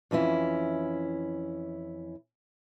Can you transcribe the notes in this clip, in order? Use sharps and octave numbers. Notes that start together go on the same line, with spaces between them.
F2 E3 C#4 E4